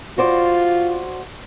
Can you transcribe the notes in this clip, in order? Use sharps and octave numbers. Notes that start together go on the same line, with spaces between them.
F4 F#4 C5 D5